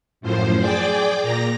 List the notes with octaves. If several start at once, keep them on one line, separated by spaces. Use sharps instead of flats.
F#2 A2 F3 C5
G#4 D5 G5 D6
A#2 A#5 A#6